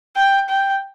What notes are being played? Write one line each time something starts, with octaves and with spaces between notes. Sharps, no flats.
G5
G5